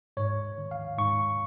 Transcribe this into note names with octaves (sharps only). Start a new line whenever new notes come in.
G#2 C#5
D#3
F5
G#2 C#6